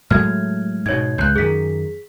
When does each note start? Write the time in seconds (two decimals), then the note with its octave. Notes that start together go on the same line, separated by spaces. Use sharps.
0.11 A2 F#3 G#3 F6 G#6
0.86 G#2 B2 C#5 G#6
1.18 C#2 F#6 G6
1.36 F#2 D#3 G#4 B6